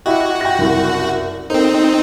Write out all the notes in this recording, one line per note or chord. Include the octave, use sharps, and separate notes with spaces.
E4 F#4 G4 D#5
G5 A#6
F#1 C2
C4 D#4 A4 A#4 C5